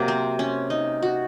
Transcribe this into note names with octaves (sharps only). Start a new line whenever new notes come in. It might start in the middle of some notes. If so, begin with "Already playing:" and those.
Already playing: C3 F#3 A#3
C4
C#4
D#4
F#4